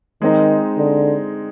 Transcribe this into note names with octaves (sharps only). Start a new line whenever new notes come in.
D#3 G#3 C4 D#4
D3